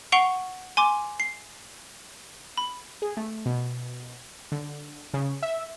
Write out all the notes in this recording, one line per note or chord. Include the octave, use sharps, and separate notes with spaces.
F#5 C#6 C7 D7 F7 G7
G#5 C6 D6
C7
B5
G#4
A3
B2
D3
C#3
E5